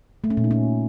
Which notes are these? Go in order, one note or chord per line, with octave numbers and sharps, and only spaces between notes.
A3
C#4
A#2
D#4
C#4